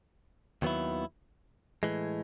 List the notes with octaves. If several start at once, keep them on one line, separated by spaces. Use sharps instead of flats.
D#2 D#3 F#3 B3 E4
A2 E3 G#3